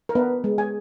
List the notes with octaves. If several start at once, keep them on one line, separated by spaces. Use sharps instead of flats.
A#4
B3 D4 B4
G#3
G#4 G#5